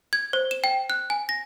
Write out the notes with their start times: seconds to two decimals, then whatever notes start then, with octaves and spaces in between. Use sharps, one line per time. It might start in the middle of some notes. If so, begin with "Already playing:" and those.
0.13 G#6
0.33 C5
0.51 E7
0.64 G5
0.90 F#6
1.10 G#5
1.29 A#6